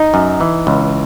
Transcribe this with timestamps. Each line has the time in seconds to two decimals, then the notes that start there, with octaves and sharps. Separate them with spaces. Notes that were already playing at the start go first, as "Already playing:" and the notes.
Already playing: D#4
0.14 F#2
0.41 E3
0.67 C#2